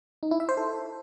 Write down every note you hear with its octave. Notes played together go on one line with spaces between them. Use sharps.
D#4
E4
E5
C5
A4